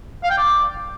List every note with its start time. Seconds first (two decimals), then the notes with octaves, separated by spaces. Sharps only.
0.23 F5
0.30 G5
0.37 D5